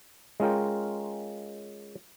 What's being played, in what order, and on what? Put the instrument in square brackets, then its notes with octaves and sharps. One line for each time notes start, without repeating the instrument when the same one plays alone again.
[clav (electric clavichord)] G#3 C#4 F4 A#4 G5